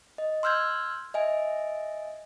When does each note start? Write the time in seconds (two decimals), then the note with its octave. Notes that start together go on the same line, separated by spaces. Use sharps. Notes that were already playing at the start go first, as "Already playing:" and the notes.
0.18 D#5
0.43 C6 E6 F6 G6 G#6
1.14 D#5 E5 G#5